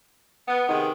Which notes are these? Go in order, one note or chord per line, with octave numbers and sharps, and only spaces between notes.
B3
C3 D#3 G#3 B3